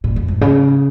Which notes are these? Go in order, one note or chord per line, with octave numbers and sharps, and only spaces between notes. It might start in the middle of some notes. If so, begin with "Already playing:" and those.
A#2
F2
G#2
C#3